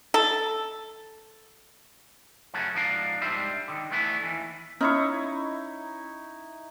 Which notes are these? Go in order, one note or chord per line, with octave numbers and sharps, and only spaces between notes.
A4
F#2 C#3 F#3 A3 C#4 F#4
G#2 F3 B3 D4 A#4 F5
G#2 G3 D4 C5 E5 B5
D3 D#3
E3 A3 B3 D4 E4
D#2 E3
C#4 D#4 E4 C#6